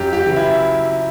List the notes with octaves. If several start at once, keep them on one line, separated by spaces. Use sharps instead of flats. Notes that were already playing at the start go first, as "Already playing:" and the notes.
Already playing: F#2 G4
G4
C#3 E3
E4